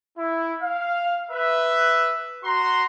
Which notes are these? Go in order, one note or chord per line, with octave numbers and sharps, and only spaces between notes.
E4
F5
B4 E5
F#4 A#5 C6